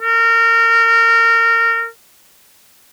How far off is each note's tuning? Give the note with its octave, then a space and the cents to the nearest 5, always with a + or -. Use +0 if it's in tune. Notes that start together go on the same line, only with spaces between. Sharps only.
A#4 -25